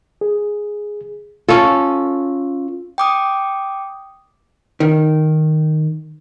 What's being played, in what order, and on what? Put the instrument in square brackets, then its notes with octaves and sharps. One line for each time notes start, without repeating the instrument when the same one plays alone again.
[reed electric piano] G#4
[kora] C#4 A4 [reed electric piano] F4
[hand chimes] G5 D6 D#6
[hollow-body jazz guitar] D#3